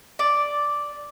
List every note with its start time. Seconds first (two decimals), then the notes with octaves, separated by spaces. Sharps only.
0.19 D5